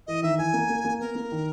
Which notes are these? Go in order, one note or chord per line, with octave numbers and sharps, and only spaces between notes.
E3 D#5
D#3 E5
E3 G#5
A#3
A#3
A#3
B3 A#4
A#3
D#3